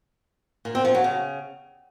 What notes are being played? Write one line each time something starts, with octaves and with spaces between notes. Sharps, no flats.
A#2
C4
F3
F#3
C#3